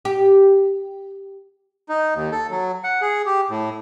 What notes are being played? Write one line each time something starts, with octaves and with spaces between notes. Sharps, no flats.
G4
D#4
D#2
A4
F#3
F#5
G#4
G4
A2